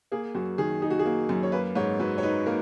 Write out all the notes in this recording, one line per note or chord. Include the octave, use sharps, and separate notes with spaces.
A#3 G#4
F#2 F#4
D#3 G#4
D#4 G#4
F#4
G#4
A#3
F#2
C#5
A#3 B4
G#2 C#5
F#3 B4
C#5
D#4 B4
A#3 A#4